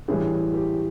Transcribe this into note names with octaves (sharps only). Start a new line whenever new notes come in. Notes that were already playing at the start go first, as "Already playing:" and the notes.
A2 E3 G3 G#4
G4